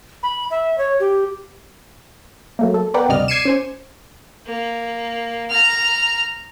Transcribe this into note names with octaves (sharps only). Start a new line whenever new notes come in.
B5
E5
C#5
G4
F#3 A3 A#3
A4
B3 A#4 B4 D5 F#5 G5
D2 G2 C3 D5 D#5 F6
D6 G#6 C7 C#7 D#7 E7
C#4 C5 G#5
A#3
A#5 F6